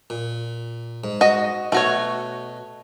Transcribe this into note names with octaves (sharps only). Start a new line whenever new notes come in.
A#2
G#2
F#4 D#5
B2 A3 F#4 C#5